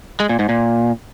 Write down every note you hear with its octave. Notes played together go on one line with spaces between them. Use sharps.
G#3
A#2
G#2
A#2